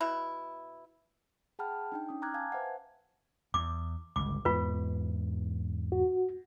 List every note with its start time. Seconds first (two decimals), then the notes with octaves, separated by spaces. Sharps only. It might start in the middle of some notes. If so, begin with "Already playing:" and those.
0.01 B2 E4
1.59 G#4 F#5 G5 A5 B5 F6
1.92 D4 D#4 G5
2.09 C#4 D#6
2.22 G5 A#5 D6 F6 F#6 G#6
2.34 F5 G#5 A5 G#6
2.52 B4 C5 E5 F#5
3.54 E2 D6
4.16 G1 C#2 D6
4.45 E2 G#2 B3 F4 B4
5.92 F#4